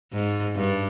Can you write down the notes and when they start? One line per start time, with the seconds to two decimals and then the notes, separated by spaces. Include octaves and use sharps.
0.13 G#2
0.56 G2